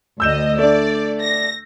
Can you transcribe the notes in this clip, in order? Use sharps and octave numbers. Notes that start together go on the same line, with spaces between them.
D2 D#5 E6 G6 E7
A3 D4 D5
A#6